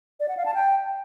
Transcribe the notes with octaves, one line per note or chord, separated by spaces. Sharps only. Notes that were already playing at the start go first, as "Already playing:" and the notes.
D5
F#5
F5
A5
G5